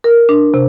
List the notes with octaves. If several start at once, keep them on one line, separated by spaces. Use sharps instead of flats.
A#4
D4
C3